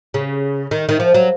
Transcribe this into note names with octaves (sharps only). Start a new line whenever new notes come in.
C#3
D#3
D#3
F3
F#3